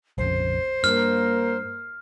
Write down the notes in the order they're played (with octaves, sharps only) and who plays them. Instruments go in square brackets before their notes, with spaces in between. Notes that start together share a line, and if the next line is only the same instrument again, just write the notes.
[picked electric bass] A#1 F2 C#3 [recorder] C5
[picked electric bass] G2 [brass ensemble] A#3 A#4 [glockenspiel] F6